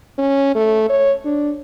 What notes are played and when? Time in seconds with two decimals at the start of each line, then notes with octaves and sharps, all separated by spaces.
0.18 C#4
0.55 A3
0.89 C#5
1.25 D4